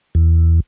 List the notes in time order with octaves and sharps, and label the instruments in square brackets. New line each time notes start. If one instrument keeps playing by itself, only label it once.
[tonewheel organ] E2